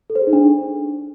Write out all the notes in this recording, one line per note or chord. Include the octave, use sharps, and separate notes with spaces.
A4
C5
G#4
D#4
D4